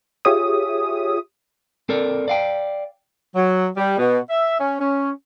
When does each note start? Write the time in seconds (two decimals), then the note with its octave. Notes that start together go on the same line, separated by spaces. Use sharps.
0.25 F4 G4 G#4 C#5 E5 D#6
1.89 C4 A4 A#4 D5
2.28 D5 F5 G5
3.36 F#3
3.77 G3
3.98 B2
4.30 E5
4.60 C#4
4.80 C#4